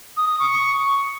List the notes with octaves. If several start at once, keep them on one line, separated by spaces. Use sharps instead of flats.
D#6
D#6
C#6